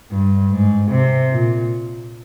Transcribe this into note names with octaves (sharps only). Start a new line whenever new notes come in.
G2
G#2
C3
A#2